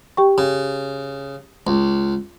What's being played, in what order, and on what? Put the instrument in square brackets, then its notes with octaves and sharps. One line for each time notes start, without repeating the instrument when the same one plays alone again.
[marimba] G4 G5 C#6
[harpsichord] C#3
C#2